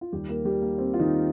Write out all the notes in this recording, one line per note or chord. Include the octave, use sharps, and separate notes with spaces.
F4
D#2 D#3 G3 G4
A#3 A#4
G3 G4
A#3
C4
F4
D#3 D#4